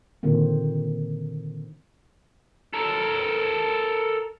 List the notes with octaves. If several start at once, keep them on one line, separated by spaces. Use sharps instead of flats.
A#2 D3 D#3 A#3 C4
A4 A#4